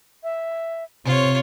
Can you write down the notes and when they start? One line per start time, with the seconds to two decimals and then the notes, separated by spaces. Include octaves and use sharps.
0.23 E5
1.06 C3 C4 F4 C5 C#5